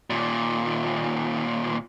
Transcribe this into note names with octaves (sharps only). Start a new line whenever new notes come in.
D#2 A#2